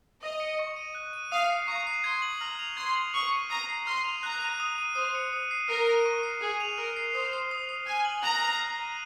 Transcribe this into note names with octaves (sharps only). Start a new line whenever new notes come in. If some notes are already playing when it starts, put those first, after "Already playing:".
D#5 D#6
C#7
C#6
D#7
F#6
D#7
F5 D#6
C7
A#5 C#6
C7
C6 G#6
F#7
A#5 F6
F7
C6 G#6
F#7
C#6 D#6
D#7
A#5 D#6
C7
C6 F6
F7
A#5 F#6
D#7
D#6
D#7
C5 D#6
C#7
D#6
C7
A#4 F6
D#7
C#6
C7
G#4 D#6
F7
A#4 F6
C7
C5 D#6
C7
D#6
C7
G#5 F6
F#7
A#5 F#6
F7
F6
D#7